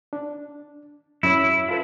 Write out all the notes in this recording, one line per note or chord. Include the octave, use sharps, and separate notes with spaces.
D4
F#2 C#4 E4 C#5
F4 A4 B4